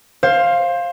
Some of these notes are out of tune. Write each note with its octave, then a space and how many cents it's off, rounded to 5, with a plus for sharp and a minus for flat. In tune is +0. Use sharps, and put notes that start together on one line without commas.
C5 +20 F5 +0